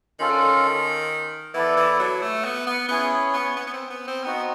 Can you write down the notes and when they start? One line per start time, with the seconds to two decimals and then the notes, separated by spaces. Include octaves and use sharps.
0.19 D#3 C#4 F4 A4
0.30 D3
0.40 D#3
1.54 E3 B3 E4 A4 D5
1.77 E3
2.00 F#3
2.22 A3
2.45 B3
2.67 B3
2.89 B3 C#4 E4 G#4 C#5
3.34 B3
3.57 B3
3.67 B3
3.73 C4
3.90 B3
4.07 C4
4.24 B3 C4 D#4 F#4